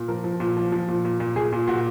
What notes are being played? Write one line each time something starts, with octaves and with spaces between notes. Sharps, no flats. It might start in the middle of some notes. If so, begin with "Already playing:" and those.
Already playing: A#2
F3 A#4
F3
A#2
F3
F3
A#2
A#2
A#2
A#2 G#4
A#2
A#2 F#4